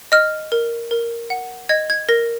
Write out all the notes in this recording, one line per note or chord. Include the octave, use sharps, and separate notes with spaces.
D#5 F6
A#4
A#4
F#5
D#5 G#6
G#6
A#4 A#6